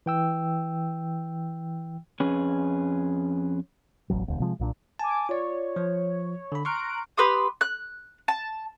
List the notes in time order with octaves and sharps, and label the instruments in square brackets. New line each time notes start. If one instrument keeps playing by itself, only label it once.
[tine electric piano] E3 G5 E6
[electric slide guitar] F2 C#4 G#4 B4
[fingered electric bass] E1 A1 F#3
E1 D2
C3 F3 G#3
B1 A#2 D4
[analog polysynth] G#5 D6 [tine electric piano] A5
[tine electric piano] F4 D5 [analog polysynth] C#5
[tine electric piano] F3
D3 B5
[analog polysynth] A#5 F#6 D7 [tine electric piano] C6 C#6 F6
[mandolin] G4 B4 C6 D#6
F#6
A5